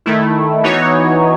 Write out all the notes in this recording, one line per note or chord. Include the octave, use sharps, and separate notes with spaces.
D#3 A3 E4
E3 B3 D#4 F#4 C#5